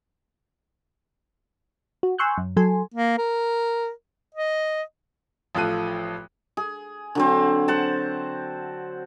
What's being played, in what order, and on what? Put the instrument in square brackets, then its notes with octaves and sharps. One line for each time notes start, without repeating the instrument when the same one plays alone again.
[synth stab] F#4
G#5 C6 C#6 E6 F#6 G6
F#2
F#3 A4 G#5 C6
[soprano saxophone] A#3
A#4
D#5
[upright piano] A1 F3 F4 A4 F#6 D#7
[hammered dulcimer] G#4
D3 F#3 C4
C5 F#5 A5